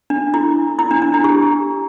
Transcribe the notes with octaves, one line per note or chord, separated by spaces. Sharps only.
D4
E4
E4
D4
D4
E4
G4